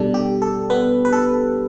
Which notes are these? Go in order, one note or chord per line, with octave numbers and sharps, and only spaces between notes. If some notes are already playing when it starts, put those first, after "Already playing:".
Already playing: B2 G3 D4 A4
G4
A4
B3 B4
B4
A4